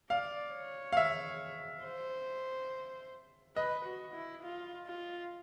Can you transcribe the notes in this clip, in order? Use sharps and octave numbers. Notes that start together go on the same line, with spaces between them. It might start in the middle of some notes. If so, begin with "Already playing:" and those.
D5 F5
C#5
F5
E5
C5
B4 D#5
F#4
E4
F4
F4